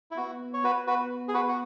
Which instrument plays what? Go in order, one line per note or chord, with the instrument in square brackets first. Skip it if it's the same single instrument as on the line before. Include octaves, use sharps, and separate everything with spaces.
[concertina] E4
[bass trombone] B3 [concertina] F#4
[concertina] C#5
[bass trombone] B3 [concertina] F#4 B4
[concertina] F#4 B4
G#4
F#4 B4
F#4